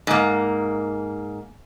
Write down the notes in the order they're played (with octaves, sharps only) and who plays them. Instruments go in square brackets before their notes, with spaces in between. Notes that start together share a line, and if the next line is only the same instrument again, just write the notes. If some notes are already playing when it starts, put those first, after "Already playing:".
[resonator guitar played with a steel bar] G#2 A#3